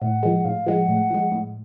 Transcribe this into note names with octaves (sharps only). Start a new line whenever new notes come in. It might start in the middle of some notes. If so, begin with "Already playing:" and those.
A2 F#5
F3 G#3
A2 F5
F3 G#3 F#5
A2
F3 G#3
A2